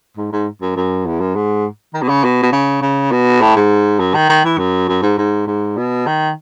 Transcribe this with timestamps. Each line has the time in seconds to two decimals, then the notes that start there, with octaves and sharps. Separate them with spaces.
0.17 G#2
0.32 G#2
0.62 F#2
0.76 F#2
1.06 E2
1.20 F#2
1.35 G#2
1.94 D#3
2.02 B2
2.09 C#3
2.24 B2
2.43 B2
2.53 C#3
2.82 C#3
3.12 B2
3.41 A2
3.56 G#2
3.99 F#2
4.14 D#3
4.29 D#3
4.44 E3
4.58 F#2
4.89 F#2
5.03 G#2
5.18 G#2
5.47 G#2
5.77 B2
6.06 D#3